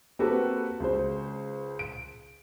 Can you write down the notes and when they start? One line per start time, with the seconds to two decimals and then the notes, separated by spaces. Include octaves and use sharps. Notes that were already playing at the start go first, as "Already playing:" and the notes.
0.19 A#3 C4 F#4 G4 A4 B4
0.80 C#2 C5
1.79 D7